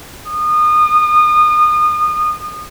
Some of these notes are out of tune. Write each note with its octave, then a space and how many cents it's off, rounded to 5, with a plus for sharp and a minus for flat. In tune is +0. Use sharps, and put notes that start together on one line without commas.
D#6 -30